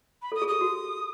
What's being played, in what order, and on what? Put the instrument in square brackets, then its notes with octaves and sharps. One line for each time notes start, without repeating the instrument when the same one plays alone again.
[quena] B5
[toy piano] A4 [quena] D#6
[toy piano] G#4
[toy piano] G4 [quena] D#6
[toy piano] F#4